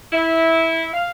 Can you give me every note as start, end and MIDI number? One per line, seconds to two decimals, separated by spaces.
0.12 0.87 64
0.94 1.09 77